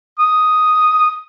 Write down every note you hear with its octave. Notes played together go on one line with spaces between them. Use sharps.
D#6